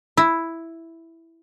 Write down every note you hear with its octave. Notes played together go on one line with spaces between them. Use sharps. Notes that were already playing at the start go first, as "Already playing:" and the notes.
E4